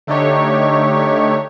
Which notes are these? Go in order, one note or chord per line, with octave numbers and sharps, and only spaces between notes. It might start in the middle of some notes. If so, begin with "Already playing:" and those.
D3 A3 D4 D#4 G4 C#5